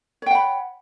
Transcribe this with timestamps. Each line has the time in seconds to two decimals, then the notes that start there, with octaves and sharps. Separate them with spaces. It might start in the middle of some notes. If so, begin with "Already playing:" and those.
0.22 C#5
0.26 G5
0.31 F#5
0.35 B5